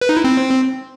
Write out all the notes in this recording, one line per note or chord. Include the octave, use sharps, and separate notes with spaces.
B4
D#4
E4
C4